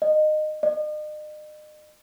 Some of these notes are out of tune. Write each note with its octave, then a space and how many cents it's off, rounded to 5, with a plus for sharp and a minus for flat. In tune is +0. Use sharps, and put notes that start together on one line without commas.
D#5 -20
D#5 -40